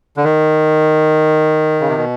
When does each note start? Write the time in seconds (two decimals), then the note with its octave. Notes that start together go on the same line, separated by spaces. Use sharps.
0.17 D3
0.24 D#3
1.81 C#3
1.88 C3
1.97 B2